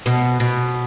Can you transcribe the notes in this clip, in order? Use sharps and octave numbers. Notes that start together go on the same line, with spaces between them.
B2
B2